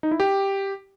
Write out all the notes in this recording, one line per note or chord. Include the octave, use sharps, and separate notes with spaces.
D#4
E4
G4